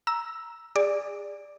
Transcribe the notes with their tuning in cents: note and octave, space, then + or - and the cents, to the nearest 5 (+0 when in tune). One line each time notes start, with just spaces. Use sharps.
A#5 +10 E6 +0
G#4 -30 D5 +0